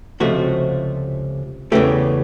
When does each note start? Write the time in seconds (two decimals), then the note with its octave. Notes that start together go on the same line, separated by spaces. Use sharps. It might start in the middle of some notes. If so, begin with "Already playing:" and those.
0.20 C#2 C3 F3 A3 F#4
1.72 E2 C#3 E3 A3 G4